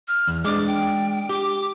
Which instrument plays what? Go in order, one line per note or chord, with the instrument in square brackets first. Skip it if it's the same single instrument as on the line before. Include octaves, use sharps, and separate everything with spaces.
[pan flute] F6
[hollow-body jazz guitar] E2
[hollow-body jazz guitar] G#3 D4 [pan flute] D6
[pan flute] G5
[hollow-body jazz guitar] G4 [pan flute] D6